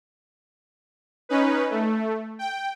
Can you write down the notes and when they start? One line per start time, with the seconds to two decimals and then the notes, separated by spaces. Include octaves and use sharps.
1.29 C#4 D#4 B4
1.70 A3
2.39 G5